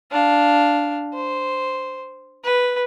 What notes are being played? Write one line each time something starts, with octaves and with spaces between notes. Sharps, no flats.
D4 F5
C5
B4